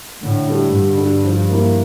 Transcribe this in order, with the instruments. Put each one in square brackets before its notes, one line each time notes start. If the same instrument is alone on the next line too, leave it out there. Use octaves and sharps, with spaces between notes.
[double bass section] A2 [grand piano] D3
[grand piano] G3 D4 A4
[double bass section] G2 [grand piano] D3
[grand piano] G3 D4 A4
F3
A#3 E4 A#4